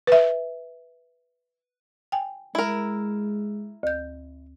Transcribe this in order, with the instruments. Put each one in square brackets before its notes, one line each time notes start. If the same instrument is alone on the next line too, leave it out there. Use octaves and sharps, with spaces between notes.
[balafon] B4 E5
[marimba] G5 G#5
[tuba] G#3 [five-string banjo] E4 A#4
[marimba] D2 G6